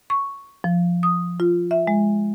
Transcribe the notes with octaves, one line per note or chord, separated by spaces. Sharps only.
C#6
F3
D#6
F4
E5
G#3